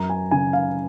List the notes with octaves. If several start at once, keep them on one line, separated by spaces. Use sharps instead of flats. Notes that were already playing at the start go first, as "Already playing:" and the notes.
Already playing: F#2 A#5
G#5
C#3 G#5
F5